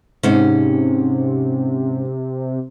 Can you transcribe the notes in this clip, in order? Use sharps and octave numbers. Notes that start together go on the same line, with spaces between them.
G#2 C3 C#4